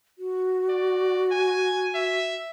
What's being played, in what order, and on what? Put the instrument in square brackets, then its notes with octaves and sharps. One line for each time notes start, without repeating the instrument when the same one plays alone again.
[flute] F#4
[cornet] D5
G#5
E5